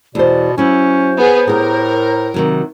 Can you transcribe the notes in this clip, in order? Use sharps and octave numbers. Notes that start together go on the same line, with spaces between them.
E2 B2 C5 D5
F#3 C#4 E4 C5
B3 G#4
A2 G4 G#4 A#4
C3 D#3 F#3